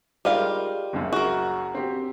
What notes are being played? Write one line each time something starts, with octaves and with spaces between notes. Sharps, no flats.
G3 G#3 D#4 F4 A#4 F5
F#1 C#2 F#2
F#4 A#4
C4 G4